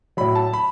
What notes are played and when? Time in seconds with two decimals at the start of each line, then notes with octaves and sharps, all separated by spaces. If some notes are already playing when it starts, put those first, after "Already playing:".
0.17 A2 F#3 B5
0.35 A5
0.53 B5